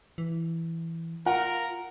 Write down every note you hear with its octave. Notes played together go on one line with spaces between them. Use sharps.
E3
F4 A#4 F#5